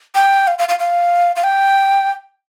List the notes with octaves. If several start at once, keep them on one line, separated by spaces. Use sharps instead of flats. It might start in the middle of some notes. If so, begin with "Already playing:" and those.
G5
F5
F5
F5
F5
F5
G5